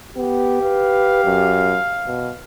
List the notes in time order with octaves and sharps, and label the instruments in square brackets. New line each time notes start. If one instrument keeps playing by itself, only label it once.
[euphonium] B3 [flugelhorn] G4
[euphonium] B4 [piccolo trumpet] F5
[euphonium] F#2
B2